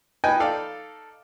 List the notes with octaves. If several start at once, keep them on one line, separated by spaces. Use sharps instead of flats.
D#4 B4 D#5 G5 G#5
D#4 A4 D5 F5